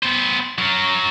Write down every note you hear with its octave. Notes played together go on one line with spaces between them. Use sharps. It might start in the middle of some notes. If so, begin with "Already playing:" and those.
B3 C5
F#3 A#4